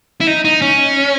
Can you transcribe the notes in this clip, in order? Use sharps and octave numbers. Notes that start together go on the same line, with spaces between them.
E4
D#4
D#4
C#4